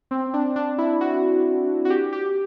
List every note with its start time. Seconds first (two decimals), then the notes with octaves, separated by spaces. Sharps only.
0.11 C4
0.34 D4
0.56 D4
0.78 E4
1.01 F#4
1.85 F#4
1.90 G4
2.13 G4